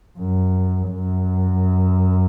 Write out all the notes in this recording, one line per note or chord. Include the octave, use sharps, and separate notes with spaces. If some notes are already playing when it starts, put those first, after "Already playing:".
F#2
F#2